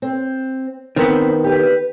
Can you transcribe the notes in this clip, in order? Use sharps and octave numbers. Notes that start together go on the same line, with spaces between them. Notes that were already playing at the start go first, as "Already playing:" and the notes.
C4
D#3 B3 C4
G4 B4